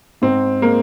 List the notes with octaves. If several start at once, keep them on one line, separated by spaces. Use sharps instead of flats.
G#2 C4
G#3 A#3